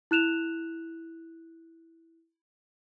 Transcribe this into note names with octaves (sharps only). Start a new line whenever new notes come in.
E4 F#6 E7 F7